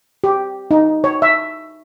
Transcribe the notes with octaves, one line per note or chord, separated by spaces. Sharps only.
G4
D#4
C#5
E5